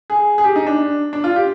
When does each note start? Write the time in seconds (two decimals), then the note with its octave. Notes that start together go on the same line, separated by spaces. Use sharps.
0.10 G#4
0.38 G#4
0.44 G4
0.56 D#4
0.67 D4
1.13 D4
1.24 F4
1.36 G4